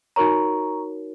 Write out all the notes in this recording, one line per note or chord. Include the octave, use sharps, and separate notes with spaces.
D#4 F#4 A#4 C#5 A#5 C#6